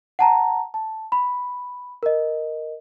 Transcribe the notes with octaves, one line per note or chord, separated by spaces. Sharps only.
F#5 A5 A#5
A5
B5
A#4 D#5